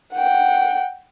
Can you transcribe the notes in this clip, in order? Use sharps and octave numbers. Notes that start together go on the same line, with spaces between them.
F#5 G5